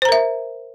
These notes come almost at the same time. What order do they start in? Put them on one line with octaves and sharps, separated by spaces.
C5 A#5 A#4 E5